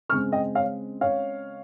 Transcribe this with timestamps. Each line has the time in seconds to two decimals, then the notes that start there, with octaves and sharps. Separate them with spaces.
0.09 C#3 G#3 C4 C#6 F6
0.32 D#5 G5
0.55 C#5 F5
1.01 C#5 F5